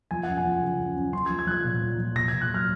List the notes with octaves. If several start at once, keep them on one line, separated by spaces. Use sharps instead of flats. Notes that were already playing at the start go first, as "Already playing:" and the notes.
F3 G#5
F#2 F#5
G#5
F3
C#3
F#2
F#2
F3 C6
G#6
F3
G#6
F3 F#6 G#6
A#2
F3
F3
A#2 A#6
G#6
A#2
F#6
F#3 F6